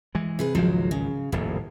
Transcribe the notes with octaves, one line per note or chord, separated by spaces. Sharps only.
E3 G#3
C3 G#4 B4
G#1 C#2 F3 F#3 F#4
C#3
D#1 A#1 F2 A2